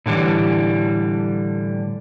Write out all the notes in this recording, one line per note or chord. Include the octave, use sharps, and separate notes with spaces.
A2 D3 E3 G3